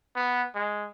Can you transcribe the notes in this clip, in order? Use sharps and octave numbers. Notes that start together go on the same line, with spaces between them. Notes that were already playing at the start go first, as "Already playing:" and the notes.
B3
G#3